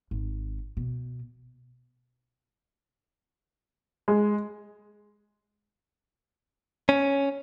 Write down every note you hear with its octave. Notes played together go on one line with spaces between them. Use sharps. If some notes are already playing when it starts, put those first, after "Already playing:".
G#1
B2
G#3
C#4